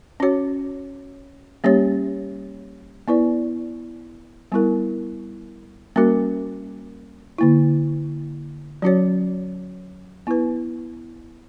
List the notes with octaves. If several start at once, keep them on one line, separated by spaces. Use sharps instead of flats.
C#4 F#4 C#5
G3 A#3 C#4 G4 C#5
B3 E4 B4 D5
G3 B3 E4 A#4
G3 A#3 C#4 F#4 A#4
D3 A#3 E4
F#3 C#4 F#4 C#5
B3 E4 B4